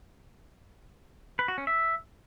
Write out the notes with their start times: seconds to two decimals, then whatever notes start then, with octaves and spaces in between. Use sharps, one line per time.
1.39 B4
1.48 F#4
1.58 C#4
1.67 E5